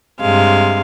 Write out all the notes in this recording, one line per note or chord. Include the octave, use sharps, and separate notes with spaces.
G2 C3 G#3 F5